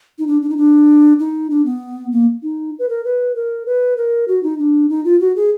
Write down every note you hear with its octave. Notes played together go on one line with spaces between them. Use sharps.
D#4
D4
D4
D#4
D4
D#4
D4
B3
A#3
D#4
B4
A#4
B4
A#4
B4
A#4
F#4
D#4
D4
D#4
F4
F#4
G#4